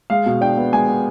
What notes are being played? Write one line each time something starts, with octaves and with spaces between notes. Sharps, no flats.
G#3 F5
B2
D4 G5
B3
G#3 G#5
B3